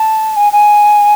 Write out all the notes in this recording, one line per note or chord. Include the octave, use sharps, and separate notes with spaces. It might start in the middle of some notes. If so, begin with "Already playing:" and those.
Already playing: A5
G#5
G#5